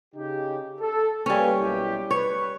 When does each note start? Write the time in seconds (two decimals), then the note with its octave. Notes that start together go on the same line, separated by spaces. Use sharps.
0.15 C#3 D#4 G4
0.80 A4
1.26 G3 A#3 C#4 B4 G#5
1.59 B1 E4 G4
2.11 B4 C#5